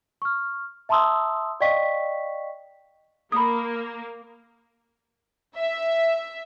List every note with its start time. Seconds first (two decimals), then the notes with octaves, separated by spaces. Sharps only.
0.22 C#6 F6
0.89 E5 A5 A#5 C6 D#6 E6
1.60 D5 D#5 F5 G5 C#6 B6
3.32 A#3 B5 D#6
5.56 E5